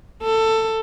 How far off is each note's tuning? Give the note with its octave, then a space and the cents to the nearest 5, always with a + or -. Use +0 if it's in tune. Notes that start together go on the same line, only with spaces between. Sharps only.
A4 +15